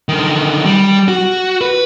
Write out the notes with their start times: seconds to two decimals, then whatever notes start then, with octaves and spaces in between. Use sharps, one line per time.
0.09 D3 D#3
0.66 G3
1.08 F#4
1.61 B4